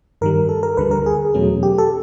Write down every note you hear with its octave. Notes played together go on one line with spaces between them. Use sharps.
G2 D#3 G3 A#4
A4
A#4
D2 D3 G3 B4
A#4
G#4
E2 B2 F#3 A3 C#4
G4
A4